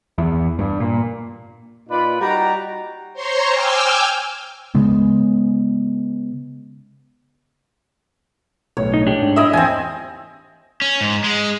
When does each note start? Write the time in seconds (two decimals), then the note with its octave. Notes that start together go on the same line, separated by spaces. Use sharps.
0.18 E2
0.59 G2
0.80 A#2
1.89 A#2 D#4 F4 B4 D5 B5
2.20 G3 D#4 F#4 G4 A#5
3.14 C5 C#5 A#5 C6 C#6
3.49 G5 G#5 D6 E6 F6 G6
4.75 C#3 G#3 B3
8.77 B1 A2 C#5
8.94 D#4
9.07 D4 G4
9.21 G#2
9.36 E4 D#5 E5
9.53 E2 C4 G#5
10.82 C#4
11.01 G#2
11.24 G#3